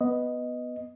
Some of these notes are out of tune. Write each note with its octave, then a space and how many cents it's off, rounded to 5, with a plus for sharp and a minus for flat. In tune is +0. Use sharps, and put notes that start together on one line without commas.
B3 +0 D#5 +0